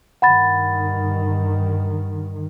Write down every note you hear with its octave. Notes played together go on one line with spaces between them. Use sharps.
G2 D#3 F#5 B5 A6